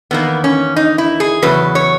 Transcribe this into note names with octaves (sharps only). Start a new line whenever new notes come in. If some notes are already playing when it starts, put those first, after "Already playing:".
E2 D#3 A#3 B3
C#4
D#4
E4
G#4
E2 C#3 F#3 B4
C#5